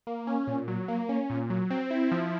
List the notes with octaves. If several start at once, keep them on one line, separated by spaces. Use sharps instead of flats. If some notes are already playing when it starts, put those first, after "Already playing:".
A#3
C#4
A#2
F#3
A#3
C#4
A#2
F#3
C4
E4
F3